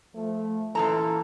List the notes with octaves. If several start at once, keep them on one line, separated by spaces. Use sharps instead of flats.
F3 A3
F#2 A#2 E3 A4 A#5